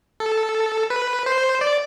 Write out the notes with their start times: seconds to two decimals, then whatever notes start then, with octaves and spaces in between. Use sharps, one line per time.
0.20 A4
0.90 B4
1.26 C5
1.61 D5